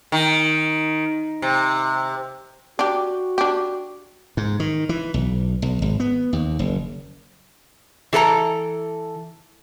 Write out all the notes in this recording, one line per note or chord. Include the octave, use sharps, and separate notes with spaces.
D#3
C3
D4 F#4 G4
D4 G4
G#2
D#3
E3
B1
B1
G#1
B3
D#2
F#1
E3 A4 B4 A#5